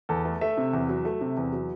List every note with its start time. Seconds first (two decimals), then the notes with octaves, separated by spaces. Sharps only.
0.09 E2 A4
0.25 A3 A4
0.41 A3 E5
0.57 C3
0.73 E2
0.89 F#3
1.05 A3
1.21 C3
1.37 E2
1.53 F#3